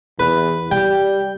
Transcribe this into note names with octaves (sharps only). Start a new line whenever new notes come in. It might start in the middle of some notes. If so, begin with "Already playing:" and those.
E2 B4
G3 G5